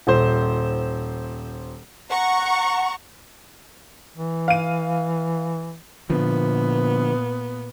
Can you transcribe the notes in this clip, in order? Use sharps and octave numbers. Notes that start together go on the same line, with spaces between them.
D#1 C5
F#5 A#5 C#6
E3
F5 D#7
A#2 D3 F3 B3